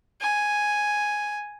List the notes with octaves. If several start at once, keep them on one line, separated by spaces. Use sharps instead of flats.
G#5